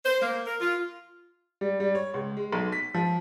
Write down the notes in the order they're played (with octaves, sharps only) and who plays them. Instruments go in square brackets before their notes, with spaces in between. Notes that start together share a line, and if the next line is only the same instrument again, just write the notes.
[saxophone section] C5
A#3
A#4
F4
[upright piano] G3
G3
C#5
C#2
G#3
B1
B6
F3